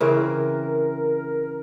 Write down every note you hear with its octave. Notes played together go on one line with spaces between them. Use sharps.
C#3 E3 C4 A#4